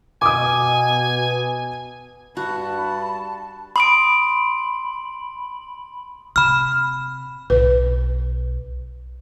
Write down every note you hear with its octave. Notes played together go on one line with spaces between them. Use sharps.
B2 G#5 D6 D#6
G2 F#4 A5 B5
B5 C6 D#6 D7
C3 B5 F6
B1 B4